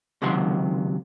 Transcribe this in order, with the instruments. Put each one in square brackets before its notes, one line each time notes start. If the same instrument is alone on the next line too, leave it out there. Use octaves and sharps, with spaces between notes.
[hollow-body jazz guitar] C#2 C3 D#3 F#3 F#5 C6